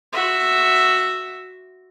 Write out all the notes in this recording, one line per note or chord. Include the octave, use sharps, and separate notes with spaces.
F#4 E5